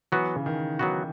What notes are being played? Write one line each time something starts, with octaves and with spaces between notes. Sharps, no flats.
E3 F#3 B3 F#4
C#3
D#3
D#3 F#3 B3 F#4